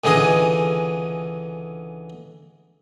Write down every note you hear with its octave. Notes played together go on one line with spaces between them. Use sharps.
C#2 D3 E3 G#4 D#5